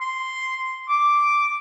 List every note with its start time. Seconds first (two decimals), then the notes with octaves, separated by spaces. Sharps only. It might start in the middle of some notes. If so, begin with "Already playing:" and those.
0.01 C6
0.89 D6